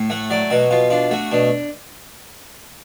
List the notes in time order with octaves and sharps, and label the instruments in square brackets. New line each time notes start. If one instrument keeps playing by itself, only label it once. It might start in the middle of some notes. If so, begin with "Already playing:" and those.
Already playing: [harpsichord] A2
A3 F#5
F#3 D5
B2 F#4
B2 F4
D4 F4
A3 F#4
B2 D4